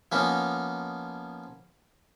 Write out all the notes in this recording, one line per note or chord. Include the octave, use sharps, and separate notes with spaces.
F3 A#3 B3 C#4 D#4